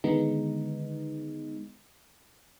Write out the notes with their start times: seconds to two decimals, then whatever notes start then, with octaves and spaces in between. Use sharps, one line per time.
0.04 D3 D#3 G#3 B3 D#4